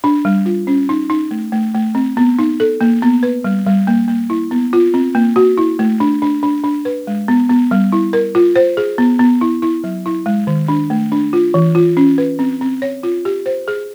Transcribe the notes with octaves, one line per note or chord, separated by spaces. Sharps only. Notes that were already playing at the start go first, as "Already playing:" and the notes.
D4
G3
F4
C#4
D#4
D#4
A3
A3
A3
C4
B3
D#4
A4
A#3
B3
B4
G3
G3
A#3
A#3
E4
B3
F4
C4
A#3
F#4
E4
A3
D4
D4
D4
D4
B4
G#3
B3
B3
G3
E4
A#4
F4
C5
G#4
B3
B3
E4
E4
F#3
E4
G#3
D#3
D4
A3
D4
F4
E3
F4
C#4
B4
C4
C4
C#5
F4
G4
C5
G#4